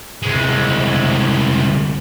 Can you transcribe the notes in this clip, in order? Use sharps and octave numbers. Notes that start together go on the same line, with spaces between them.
C2 G#3